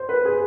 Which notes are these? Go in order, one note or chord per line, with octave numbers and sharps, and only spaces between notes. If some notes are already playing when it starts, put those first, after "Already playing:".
Already playing: C5
B4
G#4